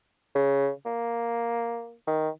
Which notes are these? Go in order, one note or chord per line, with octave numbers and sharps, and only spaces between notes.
C#3
A#3
D#3